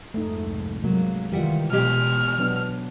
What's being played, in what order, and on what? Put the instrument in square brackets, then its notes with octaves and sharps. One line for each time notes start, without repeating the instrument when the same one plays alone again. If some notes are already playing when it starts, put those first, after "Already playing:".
[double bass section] C2 F2 G#2 [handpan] A3 D#4
[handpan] C3 G#3 A#3 [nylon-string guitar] F#3
[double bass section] D#3 [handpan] E3 F4 [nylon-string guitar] G3 E5 F#5
[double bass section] B2 [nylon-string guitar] G#3 G4 [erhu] F6
[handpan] F#3 B3 D4